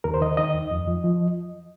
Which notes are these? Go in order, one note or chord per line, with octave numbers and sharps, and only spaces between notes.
D#2 A#4
C5
D#3 D#5
D#3 D#5
D#2
F2
F3
F3